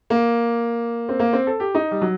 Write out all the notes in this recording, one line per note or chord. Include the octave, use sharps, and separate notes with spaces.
A#3
C4
A#3
C4
A4
G4
D#4
G3
F#3